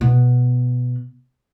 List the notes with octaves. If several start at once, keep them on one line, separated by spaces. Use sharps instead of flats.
B2 B3